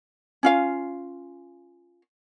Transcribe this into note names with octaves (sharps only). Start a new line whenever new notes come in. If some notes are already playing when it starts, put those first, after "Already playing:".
C#4 F4 F5